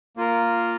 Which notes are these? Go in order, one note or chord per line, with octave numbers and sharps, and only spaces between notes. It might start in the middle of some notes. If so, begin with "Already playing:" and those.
A#3 F4 A#4